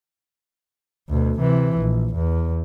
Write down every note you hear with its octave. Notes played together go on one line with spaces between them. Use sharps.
D2 B2
C3 E3
A#1
E2